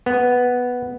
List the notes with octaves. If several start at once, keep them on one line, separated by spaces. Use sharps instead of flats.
B3